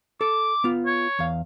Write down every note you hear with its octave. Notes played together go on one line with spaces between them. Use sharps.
A4 D6
B3 F4
C#5
E2 F5